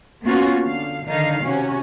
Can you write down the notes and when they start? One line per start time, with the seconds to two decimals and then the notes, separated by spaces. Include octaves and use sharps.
0.24 A#3 B3 C#4 F4 F#4
0.64 D3 F5
1.06 D3 D#3 D#4 F5
1.43 C3 C#4 F#4